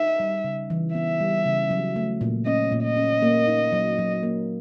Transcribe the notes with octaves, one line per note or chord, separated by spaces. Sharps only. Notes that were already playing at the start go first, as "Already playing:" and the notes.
Already playing: D#4 E5
G3
C#3
E3
B3 E5
G3
C#3
F#3
A3
A#2
C#4 D#5
A#2
D#5
C#4
A#3
D#4
F#3
F#3
A#3